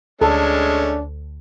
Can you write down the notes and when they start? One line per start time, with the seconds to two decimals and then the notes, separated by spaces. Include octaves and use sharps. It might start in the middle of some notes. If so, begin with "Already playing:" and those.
0.21 D2 G#3 A3 C#4 D4 A4